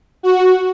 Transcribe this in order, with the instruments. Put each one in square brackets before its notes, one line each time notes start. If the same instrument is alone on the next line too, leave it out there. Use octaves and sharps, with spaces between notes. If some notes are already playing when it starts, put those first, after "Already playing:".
[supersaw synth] F#4